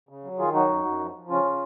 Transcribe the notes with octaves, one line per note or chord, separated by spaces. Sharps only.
C#3
F#3
D#3 F4 G#4
F#3 D#4 F#4
F#2
F#2
F3
F3
C#3 C#4 F4
C#3